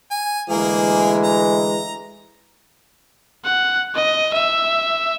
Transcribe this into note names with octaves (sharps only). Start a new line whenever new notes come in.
G#5
D2 E3 G#3 A#3 G#4
A#5
F#5
D#5
E5